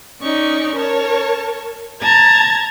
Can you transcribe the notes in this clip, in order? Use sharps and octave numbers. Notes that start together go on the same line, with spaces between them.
C#4 D#4 D5 C#6
A#4 C#5 A5
A5 A#5 G#6 A6